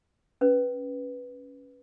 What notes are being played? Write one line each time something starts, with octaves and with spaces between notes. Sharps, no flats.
C#4 B4